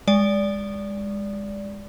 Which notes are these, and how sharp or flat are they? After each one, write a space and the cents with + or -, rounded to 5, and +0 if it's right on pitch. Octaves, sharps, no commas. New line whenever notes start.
G#3 -25 D5 -15